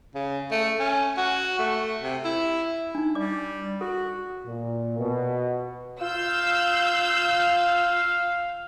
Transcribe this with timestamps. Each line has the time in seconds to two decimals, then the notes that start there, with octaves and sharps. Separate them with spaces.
0.15 C#3
0.51 A3
0.80 C#4
1.18 F#4
1.59 A3
2.02 C3
2.25 E4
2.95 D4 D#4
3.15 G3 D5 D6
3.81 F#4 A4
4.45 A#2
4.99 B2
6.02 F4 F5 E6 G6